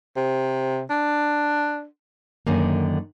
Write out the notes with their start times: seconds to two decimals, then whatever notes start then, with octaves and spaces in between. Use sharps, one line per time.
0.16 C3
0.90 D4
2.47 F#2 D3 D#3 A#3